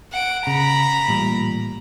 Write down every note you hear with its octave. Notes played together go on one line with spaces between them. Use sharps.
F#5 D7
C#3 A#5 B5
A1 A#2 G3